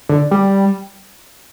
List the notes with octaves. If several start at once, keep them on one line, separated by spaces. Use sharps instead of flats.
D3
G3